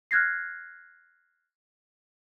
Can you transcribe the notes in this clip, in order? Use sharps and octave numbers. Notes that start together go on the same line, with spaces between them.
F6 F#6 G#6 A#6 C7